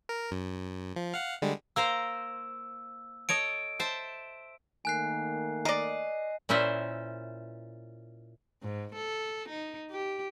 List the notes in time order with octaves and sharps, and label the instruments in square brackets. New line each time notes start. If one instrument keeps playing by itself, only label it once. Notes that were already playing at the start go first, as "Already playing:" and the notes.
[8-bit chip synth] A#4
F#2
F3
F5 F#5
D3 G3 G#3
[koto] A#3 A#4 C5 [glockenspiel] E6
[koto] A4 C#5 D#5 [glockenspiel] D7
[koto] C5 E5 A5
[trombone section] D#3 A3 A#3 [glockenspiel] G#5 F#6 C7
[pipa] A#4 D5 [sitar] D#5 [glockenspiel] C7
[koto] A#2 C#4 E4 C5 E5
[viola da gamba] G#2
A4
D#4
G4